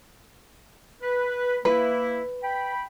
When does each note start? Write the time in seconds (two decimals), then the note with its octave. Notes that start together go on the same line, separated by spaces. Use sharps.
1.01 B4
1.65 A#3 E4 B4
2.43 G5 B5